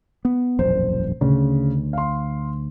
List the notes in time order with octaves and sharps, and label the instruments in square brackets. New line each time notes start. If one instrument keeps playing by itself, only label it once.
[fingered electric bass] B3
[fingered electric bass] E1 A#1 F#2 [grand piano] C5
[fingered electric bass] D2 [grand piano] C#3
[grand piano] F5 C6